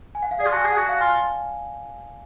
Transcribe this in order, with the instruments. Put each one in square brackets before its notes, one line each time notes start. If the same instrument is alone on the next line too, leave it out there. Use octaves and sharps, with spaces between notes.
[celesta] G#5
F#5
F5
[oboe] G#4 [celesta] D5
[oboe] F4
[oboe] F#4 [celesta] A5
[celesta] G#5
[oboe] G#4
[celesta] F#5
[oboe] F#4
[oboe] F#4 [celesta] F5
[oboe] F4 [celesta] G#5